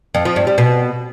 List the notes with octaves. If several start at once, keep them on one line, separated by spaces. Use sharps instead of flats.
F2
F3
G2
G3
B2